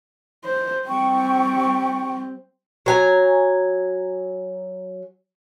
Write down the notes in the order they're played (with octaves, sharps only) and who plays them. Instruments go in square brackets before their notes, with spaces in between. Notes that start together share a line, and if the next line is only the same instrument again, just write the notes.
[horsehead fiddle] C5
[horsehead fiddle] G3 C4 [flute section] G5 C#6
[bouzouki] F#3 G#5 A#5